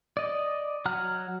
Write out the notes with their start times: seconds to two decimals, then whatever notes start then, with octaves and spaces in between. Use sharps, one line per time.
0.17 D5 D#5
0.86 F#3 F#5 A#5 F6 F#6